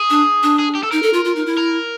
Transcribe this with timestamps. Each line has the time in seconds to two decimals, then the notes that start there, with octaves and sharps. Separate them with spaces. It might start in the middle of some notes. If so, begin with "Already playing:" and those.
Already playing: G#4
0.10 D4
0.43 D4
0.59 G#4
0.75 G4
0.83 A4
0.91 D#4 A#4
1.02 A4
1.13 F4
1.25 F4
1.36 D#4
1.46 E4
1.57 A#4